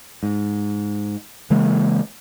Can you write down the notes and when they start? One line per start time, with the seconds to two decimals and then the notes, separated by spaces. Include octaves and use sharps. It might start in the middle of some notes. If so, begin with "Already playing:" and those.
0.23 G#2
1.50 C#3 E3 G#3 A#3